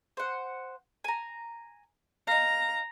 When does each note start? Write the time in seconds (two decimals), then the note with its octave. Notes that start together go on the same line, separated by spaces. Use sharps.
0.17 C5 F#5
1.04 G#5 A#5
2.27 D#4 F5 A#5